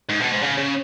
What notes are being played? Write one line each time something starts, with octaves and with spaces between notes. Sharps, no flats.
G#2
B2
G#2
C#3
C#3